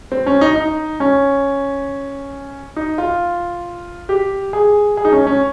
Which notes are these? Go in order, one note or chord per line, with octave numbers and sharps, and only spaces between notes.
C4
C#4
D#4
D#4
C#4
D#4
F4
G4
G#4
G#4
D#4
C#4
C#4